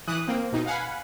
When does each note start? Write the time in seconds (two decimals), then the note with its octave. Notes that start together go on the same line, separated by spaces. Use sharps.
0.08 E3 D#6 F#6
0.27 A#3 C4
0.52 B2 D#4
0.66 F5 F#5 G#5 B5